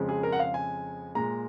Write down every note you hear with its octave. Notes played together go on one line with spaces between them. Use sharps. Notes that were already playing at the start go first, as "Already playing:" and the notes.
Already playing: F2 C#3 G#3
G#4
A#4
F#5
F5
G#5
A#2 G#3 A#5